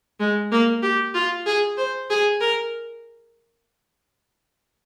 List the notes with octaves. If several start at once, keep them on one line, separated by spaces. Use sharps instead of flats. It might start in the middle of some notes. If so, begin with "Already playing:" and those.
G#3
A#3
G4
F4
G#4
C5
G#4
A#4